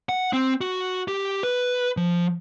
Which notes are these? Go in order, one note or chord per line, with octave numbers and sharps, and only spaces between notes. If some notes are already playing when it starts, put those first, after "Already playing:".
F#5
C4
F#4
G4
B4
F3